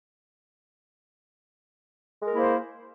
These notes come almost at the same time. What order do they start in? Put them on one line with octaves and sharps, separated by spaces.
G#3 A#4 A#3 E4 C5